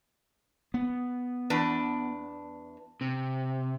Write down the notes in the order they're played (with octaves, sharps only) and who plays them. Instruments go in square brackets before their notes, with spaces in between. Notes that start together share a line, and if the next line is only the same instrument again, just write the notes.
[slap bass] B3
[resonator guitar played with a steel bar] E2 D4 B4
[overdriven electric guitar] C3